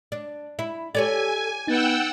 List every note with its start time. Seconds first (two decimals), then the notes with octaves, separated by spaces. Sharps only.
0.12 D4
0.59 E4
0.95 G4 A4 C#5 D5 G#5
1.67 B3 D#4 F#5 G5 E6 A6